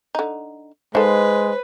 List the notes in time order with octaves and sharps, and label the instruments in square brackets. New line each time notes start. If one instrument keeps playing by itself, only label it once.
[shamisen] D3 D#4
[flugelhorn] G#3 [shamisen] D#4 A4 F5 [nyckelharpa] B4 [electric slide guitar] C5